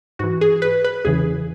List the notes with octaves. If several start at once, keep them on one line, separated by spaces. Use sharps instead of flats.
G#2 E3 F#4
G#4
B4
B4
E2 C#3 E3 G#4